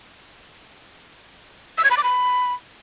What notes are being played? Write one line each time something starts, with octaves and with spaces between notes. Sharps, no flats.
E6
G#6
B5
D6
B5